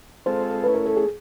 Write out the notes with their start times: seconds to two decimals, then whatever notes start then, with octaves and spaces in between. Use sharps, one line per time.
0.26 G#3 C4 F4 A4 C5
0.64 A3 C#4 E4 B4
0.75 A#4
0.86 A4
0.97 G#4